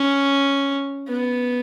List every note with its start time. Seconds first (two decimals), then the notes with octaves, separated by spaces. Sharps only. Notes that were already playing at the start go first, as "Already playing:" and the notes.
Already playing: C#4
1.08 B3